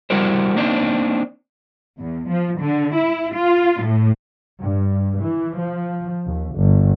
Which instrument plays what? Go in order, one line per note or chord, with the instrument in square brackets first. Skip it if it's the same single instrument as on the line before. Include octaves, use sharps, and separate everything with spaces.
[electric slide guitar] G3 E4 F#4 A#4 C5
A#3 C4 D4 D#4
[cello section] E2
F3
D3
E4
F4
A2
[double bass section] G2
E3
F3
D#2
G1